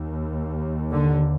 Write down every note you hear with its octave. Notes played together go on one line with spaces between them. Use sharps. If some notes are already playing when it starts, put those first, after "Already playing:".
Already playing: D#2
D3